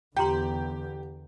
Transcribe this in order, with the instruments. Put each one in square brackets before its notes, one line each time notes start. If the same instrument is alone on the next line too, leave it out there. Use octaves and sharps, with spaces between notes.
[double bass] E2 D3 [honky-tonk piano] G4 [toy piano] G5 A#5 C6